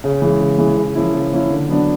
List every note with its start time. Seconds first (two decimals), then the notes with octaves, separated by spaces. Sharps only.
0.04 C#3
0.22 E3 G#3
0.40 C#3
0.58 E3 G#3
0.77 C#3
0.95 F3 A#3 C#4 E4
1.14 C#3
1.32 F3 A#3 C#4 E4
1.50 D3
1.69 F#3 B3 D4